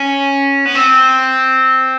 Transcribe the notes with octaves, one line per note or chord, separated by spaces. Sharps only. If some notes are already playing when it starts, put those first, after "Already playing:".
Already playing: C#4
B3
C4